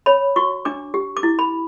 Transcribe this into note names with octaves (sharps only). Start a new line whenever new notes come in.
C#5 B5
F#4 C#6
D4 D6
G4
D6
E4
B5